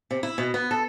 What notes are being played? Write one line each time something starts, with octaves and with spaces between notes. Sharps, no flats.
C3
E4
B2
B3
A4